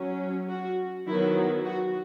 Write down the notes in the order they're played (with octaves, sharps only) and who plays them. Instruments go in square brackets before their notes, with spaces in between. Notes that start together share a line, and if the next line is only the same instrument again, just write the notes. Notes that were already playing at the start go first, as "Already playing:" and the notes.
Already playing: [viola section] F#3 C#4
F#4
D#3 F#3 B3 E4
F#4